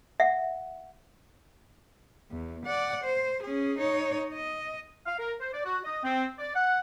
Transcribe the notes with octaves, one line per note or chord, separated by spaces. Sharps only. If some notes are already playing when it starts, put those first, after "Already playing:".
E5 F#5
E2
D5 F#5
C5
C#4 G#4
D#4 C#5
D#5
F5
A#4
C5
D5
F#4
D#5
C4
D5
F#5